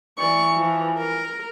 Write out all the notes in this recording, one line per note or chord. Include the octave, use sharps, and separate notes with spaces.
E3 D5 C#6
F3
A#4